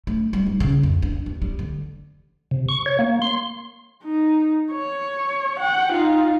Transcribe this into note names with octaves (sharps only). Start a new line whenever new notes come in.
A3
G3
D#4
C#3
F2
D4
D#2
G3
D3
C3
C#6
C#5
A#3
C6
D#4
C#5
F#5 G5
D#4 F4